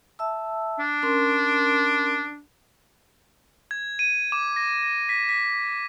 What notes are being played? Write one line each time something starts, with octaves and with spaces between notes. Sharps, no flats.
E5 A5 E6
D4
C#4 A#4 C6
G#6
D#7
D6
A#6
A#6
B6
B6